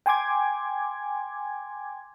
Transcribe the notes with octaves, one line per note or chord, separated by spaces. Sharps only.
G5 G#5 C6 D6 G#6